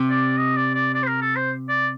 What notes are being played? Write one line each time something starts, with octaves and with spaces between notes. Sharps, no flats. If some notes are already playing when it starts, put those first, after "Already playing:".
Already playing: C3
D5
D#5
D5
D5
D5
C5
A#4
A4
C5
D5